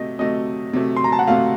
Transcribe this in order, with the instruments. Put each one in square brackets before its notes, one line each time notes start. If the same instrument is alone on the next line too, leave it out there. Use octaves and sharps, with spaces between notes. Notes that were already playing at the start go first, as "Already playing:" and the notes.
Already playing: [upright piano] C3 F#3 A3 [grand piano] D#5
[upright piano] C3 F#3 A3 [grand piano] D#5
[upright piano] C3 F#3 A3
[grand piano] C6
A#5
A5
F#5
[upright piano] C3 F#3 A3 [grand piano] F5